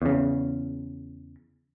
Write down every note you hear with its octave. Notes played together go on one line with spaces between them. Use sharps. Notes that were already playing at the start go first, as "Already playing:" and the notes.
E2 C#3